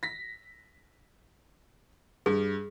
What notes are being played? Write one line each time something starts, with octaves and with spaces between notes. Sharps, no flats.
A#6 B6
G2 G#4